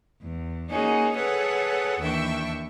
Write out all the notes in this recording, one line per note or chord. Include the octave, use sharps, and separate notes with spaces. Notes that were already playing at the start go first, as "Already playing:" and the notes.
E2
A#3 C#4 D#4 F#4 G#4
G#4 A4 B4 C#5 F#5
D#2 E3 D4 E5 G5 C#6